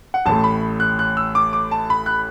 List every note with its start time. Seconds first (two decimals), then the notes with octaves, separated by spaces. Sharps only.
0.14 F#5
0.26 A1 A2 A3 A5
0.44 B5
0.80 F#6
0.99 F#6
1.17 E6
1.35 D6
1.53 D6
1.71 A5
1.90 B5
2.06 F#6